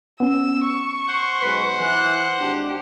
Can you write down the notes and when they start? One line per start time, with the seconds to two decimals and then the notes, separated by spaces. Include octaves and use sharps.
0.20 B3 C#4 E6
0.65 C#6
1.07 C5 F#5
1.43 B1 G#3 B4 B6
1.80 E3 F#6
2.39 G#1 D4 G4